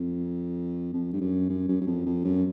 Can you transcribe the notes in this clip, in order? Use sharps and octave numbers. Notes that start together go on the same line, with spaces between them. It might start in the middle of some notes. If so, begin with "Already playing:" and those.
Already playing: F2
F2
G2
F#2
F#2
F#2
F#2
F2
F2
F#2